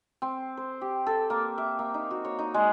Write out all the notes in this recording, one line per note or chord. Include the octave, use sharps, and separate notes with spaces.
C4
C5
G4
A4
A#3
E5
A#3
D#4
F#4
C#5
D#4
G#3